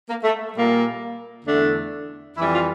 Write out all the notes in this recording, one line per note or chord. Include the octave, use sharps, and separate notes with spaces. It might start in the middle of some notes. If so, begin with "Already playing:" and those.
A#3
A3
A#2 G3 A#3
E2 D3 A3 D4
F2 E3 G3 E4
F4